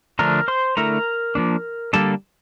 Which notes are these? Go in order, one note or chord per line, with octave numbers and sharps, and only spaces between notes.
D3 F3 A3 D4 A#4 A#5
C5 C6
D3 A3 E4 A#4 A#5
F3 A#3 D4
D3 G3 A#3 A4 A5